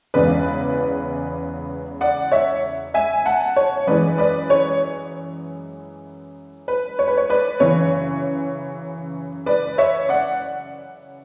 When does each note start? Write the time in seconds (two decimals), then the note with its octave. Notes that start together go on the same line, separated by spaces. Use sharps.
0.14 E2 C#3 E3 G#3 B4 D5
2.01 D5 F#5
2.32 C#5 E5
2.94 E5 G#5
3.26 F#5 A5
3.56 C#5
3.87 F#2 E3 G#3 B4 D5
4.18 B4 D5
4.50 C#5
6.68 B4
6.99 C#5
7.08 B4
7.17 C#5
7.30 B4 D5
7.60 F#2 C#3 E3 C#5
9.46 B4 D5
9.78 C#5 E5
10.09 D5 F#5